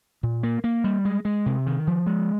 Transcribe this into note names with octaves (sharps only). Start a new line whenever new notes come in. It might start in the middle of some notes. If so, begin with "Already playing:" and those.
A#2
A#3
A#3
G3
G#3
G#3
C3
D#3
F3
G#3